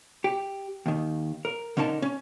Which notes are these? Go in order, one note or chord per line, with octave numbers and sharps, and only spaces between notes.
G4
D#2 D#3
A#4
D3 C#4 D#4 A#4 A5
C#4